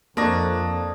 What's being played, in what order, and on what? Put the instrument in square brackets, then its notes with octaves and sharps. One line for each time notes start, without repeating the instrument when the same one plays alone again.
[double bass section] F2 [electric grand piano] A#3 A#6 [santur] D4 D#5 C#6